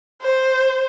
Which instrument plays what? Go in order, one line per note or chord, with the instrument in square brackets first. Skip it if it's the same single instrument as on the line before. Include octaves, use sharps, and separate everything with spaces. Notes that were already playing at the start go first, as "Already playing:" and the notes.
[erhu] C5